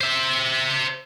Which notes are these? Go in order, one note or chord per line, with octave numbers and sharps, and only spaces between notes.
C5 E5